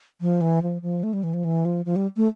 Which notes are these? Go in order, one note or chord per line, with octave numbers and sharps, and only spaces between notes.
F3
E3
F3
F3
A3
G3
E3
F3
E3
F3
F3
G3
A3